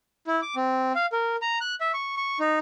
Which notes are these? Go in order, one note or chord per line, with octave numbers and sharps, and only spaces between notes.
E4
D6
C4
F5
A#4
A#5
F#6
E5
C#6
C#6
D#4